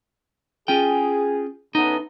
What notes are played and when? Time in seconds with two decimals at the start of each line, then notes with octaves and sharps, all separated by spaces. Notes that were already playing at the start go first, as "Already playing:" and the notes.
0.68 C#4 F4 G#4 G5
1.75 C#3 A3 B3 D#4